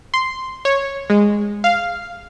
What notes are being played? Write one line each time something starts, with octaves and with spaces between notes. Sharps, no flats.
C6
C#5
G#3
F5